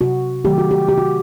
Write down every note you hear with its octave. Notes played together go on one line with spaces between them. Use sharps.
C3 F#4
D#3 F#3 A3 G4
F#4
G4
C3 G4
F#4